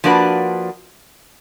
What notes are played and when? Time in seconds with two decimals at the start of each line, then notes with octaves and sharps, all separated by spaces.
0.04 F3 A#3 D4 F#4 B4